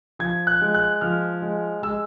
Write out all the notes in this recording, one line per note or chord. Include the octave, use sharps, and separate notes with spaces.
F3 G#6
F#6
G#3
F#6
F3 F6
G#3
G#3 E6